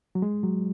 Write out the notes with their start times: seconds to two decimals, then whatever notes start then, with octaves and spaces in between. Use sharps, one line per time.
0.15 F#3
0.22 G#3
0.43 F#3